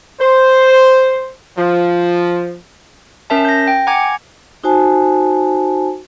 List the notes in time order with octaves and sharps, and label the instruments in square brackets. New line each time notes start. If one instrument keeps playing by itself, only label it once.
[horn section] C5
F3
[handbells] C#4 A#4 E5 A5
G6 A#6
G5
F#5 G#5 A#5 D6 G#6
[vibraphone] D#4 F#4 C5 G#5 A5